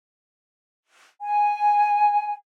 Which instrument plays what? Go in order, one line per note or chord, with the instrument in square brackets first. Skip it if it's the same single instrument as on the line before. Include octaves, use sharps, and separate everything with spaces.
[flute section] G#5